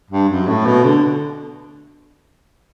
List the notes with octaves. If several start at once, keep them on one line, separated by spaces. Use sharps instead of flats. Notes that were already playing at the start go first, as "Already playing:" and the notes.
G2
F#2
A2
B2
D3